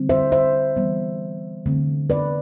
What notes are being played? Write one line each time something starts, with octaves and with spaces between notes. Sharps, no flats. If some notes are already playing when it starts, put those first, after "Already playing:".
Already playing: D3 G3 C4
C5 E5
C5 E5
E3 G3 B3
D3 A3 C4
B4 D5